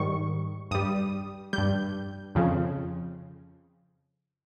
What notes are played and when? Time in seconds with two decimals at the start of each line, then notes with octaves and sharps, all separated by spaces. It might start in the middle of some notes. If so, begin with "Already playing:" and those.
Already playing: G#2 D#3 G3 C#6
0.71 G2 G3 D#6
1.53 G2 G3 G6
2.35 F2 C#3 F3